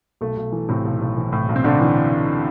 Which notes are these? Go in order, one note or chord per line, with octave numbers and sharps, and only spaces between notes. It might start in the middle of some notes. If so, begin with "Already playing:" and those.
B1 A3
B1
E3
A2 C3 C4
B1
B1
E3
A2
B1
C4
B1 D3 D4
E3